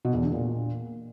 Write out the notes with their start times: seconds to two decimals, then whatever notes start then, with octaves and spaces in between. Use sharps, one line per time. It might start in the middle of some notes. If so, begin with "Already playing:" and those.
0.05 B2
0.14 E2
0.23 D3
0.32 A#2